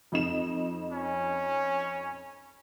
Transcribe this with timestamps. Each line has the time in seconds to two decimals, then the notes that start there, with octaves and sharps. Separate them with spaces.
0.12 F2 D#4 E7
0.93 C#4